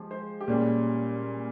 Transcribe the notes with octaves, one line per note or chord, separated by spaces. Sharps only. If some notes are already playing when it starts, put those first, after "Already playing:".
Already playing: F3 G#3 G4 G#4
C5
G4
A#2 G3 C#4 G#4